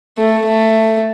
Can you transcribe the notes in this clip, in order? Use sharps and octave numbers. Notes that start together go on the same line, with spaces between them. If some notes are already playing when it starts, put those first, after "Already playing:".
A3
A3